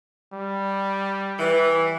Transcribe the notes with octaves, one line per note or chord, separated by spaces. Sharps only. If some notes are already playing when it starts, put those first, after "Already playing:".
G3
E3